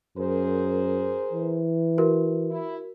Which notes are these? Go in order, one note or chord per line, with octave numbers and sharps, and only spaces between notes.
F#2 G#4 A#4 C5
E3
F#4 A#4
E4